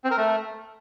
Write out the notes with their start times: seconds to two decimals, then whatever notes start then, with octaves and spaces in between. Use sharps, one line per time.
0.04 C4
0.11 A#4
0.17 A3